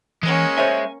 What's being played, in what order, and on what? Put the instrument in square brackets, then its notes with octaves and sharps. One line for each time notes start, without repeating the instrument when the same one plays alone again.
[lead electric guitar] E3 [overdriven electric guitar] G#3 [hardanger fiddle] A#3 C#4
[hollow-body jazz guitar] C5 C#5 E5 [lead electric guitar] G#5